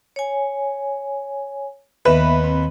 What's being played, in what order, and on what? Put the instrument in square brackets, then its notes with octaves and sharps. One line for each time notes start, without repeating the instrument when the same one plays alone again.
[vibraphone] C#5 G#5
[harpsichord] D#2 [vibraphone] B3 E5 [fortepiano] B4
[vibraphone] C4